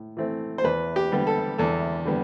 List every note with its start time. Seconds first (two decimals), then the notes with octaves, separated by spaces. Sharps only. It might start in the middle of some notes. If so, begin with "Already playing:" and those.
Already playing: A2
0.17 E3 A3 C4
0.58 C5
0.64 E2 B4
0.96 G4
1.12 D3 G3 B3
1.27 A4
1.58 E2 A4
2.05 D3 G3 B3